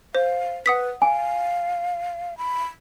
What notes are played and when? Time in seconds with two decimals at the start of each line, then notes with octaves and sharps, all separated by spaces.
0.15 C5 F5
0.66 B4 F#5 D#6 B6
1.02 F5 G#5
2.38 B5